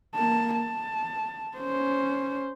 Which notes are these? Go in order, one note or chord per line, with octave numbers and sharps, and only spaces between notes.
A#3 A5
A5
C#4 C5